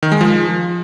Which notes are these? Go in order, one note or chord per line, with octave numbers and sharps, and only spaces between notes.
D#3
G#3
F3